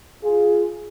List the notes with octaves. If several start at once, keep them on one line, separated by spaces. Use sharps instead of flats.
F4 G#4